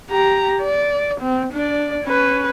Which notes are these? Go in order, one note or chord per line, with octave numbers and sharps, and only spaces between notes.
G4 A#5
D5
C4
D4 D5
C#4 B4